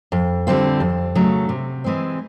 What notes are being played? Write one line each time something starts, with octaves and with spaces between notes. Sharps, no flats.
F2
D3 G3 C4 F4
F2
C#3 F#3 A3
C3
E3 G#3 C4